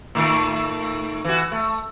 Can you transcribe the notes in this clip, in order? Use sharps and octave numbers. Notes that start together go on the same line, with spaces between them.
A2 D#3 A3
E3 F#4
A3